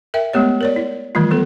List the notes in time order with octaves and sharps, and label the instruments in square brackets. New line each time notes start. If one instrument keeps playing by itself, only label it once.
[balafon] A#4 E5 G5
G#3 A3 B3 G4 C#5
A#4 C#5 D5
E4
D#3 E3 G3 A3 F4
F#3 B3 A4